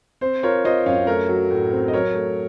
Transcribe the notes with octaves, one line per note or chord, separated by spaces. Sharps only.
C4 C5
F4 A#4 C#5
F4 C5 D#5
F#2 C#5 F5
A3 A#4 C#5
F#3
A2
C4
D#5
F#3 A#4 C#5
A3